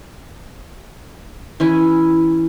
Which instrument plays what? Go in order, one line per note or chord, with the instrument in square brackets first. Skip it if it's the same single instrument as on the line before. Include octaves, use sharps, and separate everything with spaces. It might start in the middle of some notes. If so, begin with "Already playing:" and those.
[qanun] E3 C#4 E4